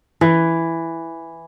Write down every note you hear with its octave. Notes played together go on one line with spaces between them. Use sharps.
E3